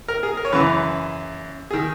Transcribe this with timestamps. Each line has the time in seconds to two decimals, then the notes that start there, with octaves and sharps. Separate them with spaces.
0.08 A#4
0.23 G#4
0.37 A#4
0.45 C#5
0.52 F#2 C#3 E3 B4
1.71 D#3 G#4